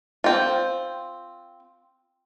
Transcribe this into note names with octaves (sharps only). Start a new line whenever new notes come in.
C4 F4